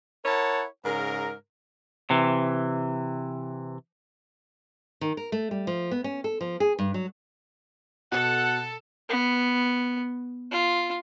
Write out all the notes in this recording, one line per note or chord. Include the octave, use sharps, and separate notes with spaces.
E4 A#4 C#5 F#5 A5
G#2 C#3 A#4
C3 E3
D#3
A#4
A3
G3
F3
B3
C#4
A4
F3
G#4
G2
F#3
B2 A4 F#5
B3
F4